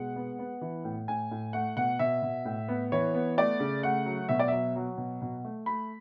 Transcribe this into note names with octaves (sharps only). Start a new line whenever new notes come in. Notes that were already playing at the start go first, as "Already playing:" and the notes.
Already playing: B2 G#3 F#5
B3
B3
E3
A2
A2 G#5
A2
A3 F#5
B2 F#5
B2 E5
B2
A2
B3
E3 C#5
B3
A3 D5
C#3
A3 F#5
F#3
B2 E5
D5
F#3 E5
F#3
B2
B2
A3
A3 B5